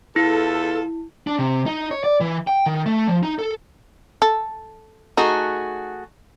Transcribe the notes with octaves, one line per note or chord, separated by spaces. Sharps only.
E2 E4 F4 A4
D4
C3
D#4
C#5
D5
E3
G5
D#3
A3
F3
D#4
A4
A4
A3 D#4 F#4 G#4